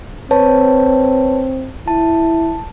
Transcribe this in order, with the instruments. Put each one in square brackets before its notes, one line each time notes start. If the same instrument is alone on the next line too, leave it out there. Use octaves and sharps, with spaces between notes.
[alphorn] C4 [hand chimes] B4 C#5 A5
[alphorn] E4 [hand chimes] A5